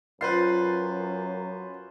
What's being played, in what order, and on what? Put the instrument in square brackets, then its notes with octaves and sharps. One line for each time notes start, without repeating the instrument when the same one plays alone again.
[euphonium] F#2 [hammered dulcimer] F4 [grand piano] B4 C5 C7